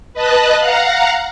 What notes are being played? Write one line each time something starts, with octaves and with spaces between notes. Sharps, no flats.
B4 D#5 A5 F#6
F5 F#5 A#5